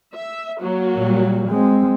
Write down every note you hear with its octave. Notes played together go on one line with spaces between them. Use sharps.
E5
F#3 A#3 F#4
A#2 G3
G#3 C4